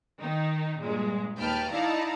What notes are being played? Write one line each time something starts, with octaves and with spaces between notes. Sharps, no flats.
D#3 D#4
G2 A#2 G#3
D#2 B4 G5 A5 F6
D#4 E4 D5 F5 A5 A#5